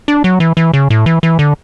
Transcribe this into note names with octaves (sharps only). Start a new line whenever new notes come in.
D4
F#3
E3
E3
C#3
A2
E3
E3
D3